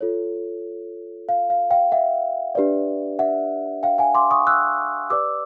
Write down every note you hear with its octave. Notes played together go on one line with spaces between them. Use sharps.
F4 A4 C#5
F5
F5
F5 G5
E5 F#5
D4 G4 B4 D5
E5 F#5
F5 G5
F#5 G#5
C6 D6
C#6 D#6
E6 F#6
G4 B4 D5 D6 E6